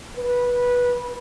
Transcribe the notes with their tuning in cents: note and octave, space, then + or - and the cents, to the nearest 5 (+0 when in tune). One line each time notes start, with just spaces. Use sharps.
B4 -15